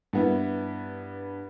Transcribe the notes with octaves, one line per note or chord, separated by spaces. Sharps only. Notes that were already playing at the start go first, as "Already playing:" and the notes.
G2 B3 E4